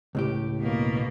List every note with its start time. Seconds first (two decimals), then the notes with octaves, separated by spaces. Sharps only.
0.15 C#2 A2 G4
0.59 B2 A#3